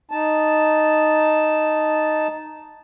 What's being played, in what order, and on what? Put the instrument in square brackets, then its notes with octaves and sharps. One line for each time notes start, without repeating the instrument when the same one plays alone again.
[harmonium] D#4 A5